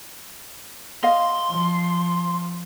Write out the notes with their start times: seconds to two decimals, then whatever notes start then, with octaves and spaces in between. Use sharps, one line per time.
1.03 D#5 F5 C6
1.50 F3